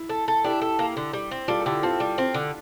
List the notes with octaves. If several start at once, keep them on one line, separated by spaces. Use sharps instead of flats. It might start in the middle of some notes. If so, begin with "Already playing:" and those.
Already playing: E4
A4
A4
D4 E4 G4
A4
A#3
D3
G3
C4
G3 F4 A4
A4
D3 E4 G4
C4 F4 A4
G3
C4
D3